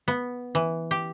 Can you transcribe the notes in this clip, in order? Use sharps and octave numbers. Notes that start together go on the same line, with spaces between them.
B3
E3
G4